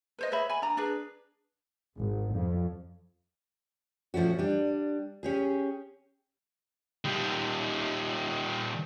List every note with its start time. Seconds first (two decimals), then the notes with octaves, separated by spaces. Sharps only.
0.19 B4 C5 D#5
0.32 B4 C#5 E5 B5
0.49 G#5 B5
0.62 D4 A#5
0.77 D4 G#4 B4
1.96 G#1
2.33 F2
4.14 A#2 F3 A3 C#4 F#4
4.39 G3 D4
5.23 C#4 G4 G#4
7.05 D#3 G3